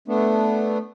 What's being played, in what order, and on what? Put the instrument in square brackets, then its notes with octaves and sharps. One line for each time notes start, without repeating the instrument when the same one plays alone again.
[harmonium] A3 B3 D4